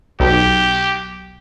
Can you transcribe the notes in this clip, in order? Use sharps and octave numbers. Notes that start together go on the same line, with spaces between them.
B1 G4